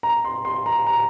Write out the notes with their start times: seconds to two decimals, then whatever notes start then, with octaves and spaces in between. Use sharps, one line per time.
0.03 A#5
0.25 C6
0.45 C6
0.66 A#5
0.87 A#5